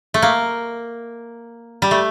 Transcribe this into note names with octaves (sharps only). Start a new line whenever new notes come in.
A3
A#3
G3
A3